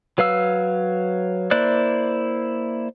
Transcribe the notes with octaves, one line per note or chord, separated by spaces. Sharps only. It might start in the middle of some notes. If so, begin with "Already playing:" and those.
F#3 B4 F5 E6
A#3 E4 C5 D5 F#6